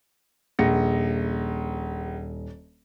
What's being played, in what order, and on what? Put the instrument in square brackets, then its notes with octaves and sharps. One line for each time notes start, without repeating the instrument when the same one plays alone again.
[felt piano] D#1 A#6 C#7 [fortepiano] A#1